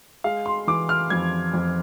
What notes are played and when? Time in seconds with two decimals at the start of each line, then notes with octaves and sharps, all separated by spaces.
0.24 G#3 F5
0.46 C6
0.67 E3 D6
0.89 F6
1.10 F2 G#6
1.54 F2